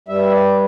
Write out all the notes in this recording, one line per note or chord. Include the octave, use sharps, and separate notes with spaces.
G2 G3 E5
D5